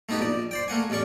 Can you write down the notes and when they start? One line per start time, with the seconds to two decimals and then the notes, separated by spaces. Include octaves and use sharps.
0.09 A3 B3 D#4 G4 B4
0.21 A#1 D5
0.51 C5 D5 G5
0.68 A3 A#3 F#5 G#5
0.90 A1 E2 C#4 D5 C#6